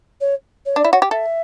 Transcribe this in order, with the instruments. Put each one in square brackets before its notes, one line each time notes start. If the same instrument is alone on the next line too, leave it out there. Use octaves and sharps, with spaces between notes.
[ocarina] C#5
C#5
[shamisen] D4 [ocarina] D5
[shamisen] E4
[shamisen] F#4 [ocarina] C#5
[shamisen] G4
[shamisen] A4 [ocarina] E5